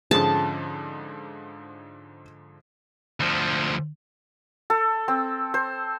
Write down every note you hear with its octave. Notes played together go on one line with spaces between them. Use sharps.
G#2 D3 F3 C#4 G#4 A5
D2 F3
A4
C4
C5